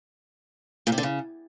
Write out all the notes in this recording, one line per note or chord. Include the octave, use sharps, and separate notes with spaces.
A#2
C3
D3
C#3